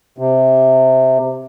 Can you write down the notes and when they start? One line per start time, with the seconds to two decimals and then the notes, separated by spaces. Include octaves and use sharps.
0.18 C3